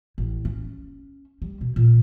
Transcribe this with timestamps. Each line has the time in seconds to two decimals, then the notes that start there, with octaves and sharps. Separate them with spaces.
0.18 A1
0.45 C#4
1.42 G3
1.61 B2
1.76 A#2